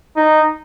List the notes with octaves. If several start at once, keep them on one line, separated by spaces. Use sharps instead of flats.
D#4